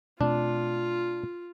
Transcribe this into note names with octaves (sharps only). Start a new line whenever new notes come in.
B2 A3 C4 D4 F4